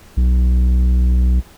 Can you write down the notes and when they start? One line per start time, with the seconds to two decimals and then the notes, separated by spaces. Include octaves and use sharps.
0.17 B1